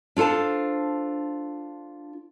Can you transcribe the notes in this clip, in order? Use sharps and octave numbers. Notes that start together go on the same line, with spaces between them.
D4 F4 A4 C5 A5